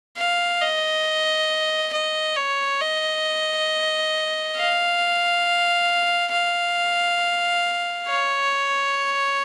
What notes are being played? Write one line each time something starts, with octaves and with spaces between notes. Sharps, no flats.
F5
D#5
D#5
C#5
D#5
F5
F5
C#5